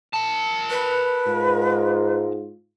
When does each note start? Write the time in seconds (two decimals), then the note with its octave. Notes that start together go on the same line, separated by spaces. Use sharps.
0.14 A#4 A5
0.70 B4
1.27 G#2 F4